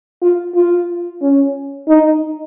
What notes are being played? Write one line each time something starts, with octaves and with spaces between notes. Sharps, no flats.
F4
F4
C#4
D#4